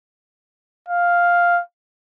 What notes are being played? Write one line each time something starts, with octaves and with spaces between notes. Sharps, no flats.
F5